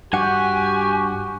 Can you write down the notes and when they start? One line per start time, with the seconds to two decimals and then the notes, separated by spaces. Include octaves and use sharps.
0.13 G2 F#4 G4 F#5 G#5